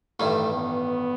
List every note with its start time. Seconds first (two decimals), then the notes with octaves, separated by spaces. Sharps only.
0.19 A1 G2 D#3 A3
0.53 B3